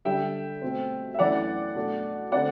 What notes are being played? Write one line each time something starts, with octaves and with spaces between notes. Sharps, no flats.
D3 G3 D4 E5 G5
B2 A3 C4
E5
F#2 E3 A3 D4 D5 F#5
B2 A3 D4
D3 A3 C4 D5 F#5